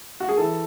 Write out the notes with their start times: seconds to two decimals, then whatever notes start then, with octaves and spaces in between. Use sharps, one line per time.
0.20 F#4
0.29 G#4
0.37 E3 A4